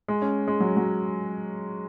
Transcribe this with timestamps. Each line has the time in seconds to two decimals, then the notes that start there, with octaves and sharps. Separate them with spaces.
0.08 G#3
0.22 C#4
0.48 G#3
0.60 F#3
0.77 F#3